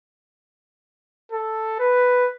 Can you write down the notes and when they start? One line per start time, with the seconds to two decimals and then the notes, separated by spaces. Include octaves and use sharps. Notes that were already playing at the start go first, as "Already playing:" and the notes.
1.32 A4
1.79 B4